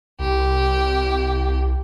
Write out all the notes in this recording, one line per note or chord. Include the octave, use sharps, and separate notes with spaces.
C2 G4